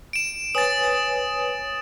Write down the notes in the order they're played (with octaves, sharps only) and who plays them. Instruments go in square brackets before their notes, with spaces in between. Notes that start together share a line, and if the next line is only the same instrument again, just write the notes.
[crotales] D7 E7
[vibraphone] B4 C#5 G#5 [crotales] D#6 A6